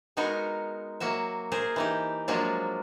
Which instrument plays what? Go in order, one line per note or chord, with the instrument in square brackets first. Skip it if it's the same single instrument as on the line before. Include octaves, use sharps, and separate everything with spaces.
[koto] G#3 B3 D#4 F#4 A#4
F#3 A#3 F#4 E5
G#4 A#4 C5
E3 D#4 G4
F3 F#3 G#3 A#3 D4 F4